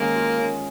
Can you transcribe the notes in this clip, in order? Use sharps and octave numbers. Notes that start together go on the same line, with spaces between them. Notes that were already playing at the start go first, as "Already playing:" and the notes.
Already playing: D#3 G#3 A#3 C#4
F4
C#4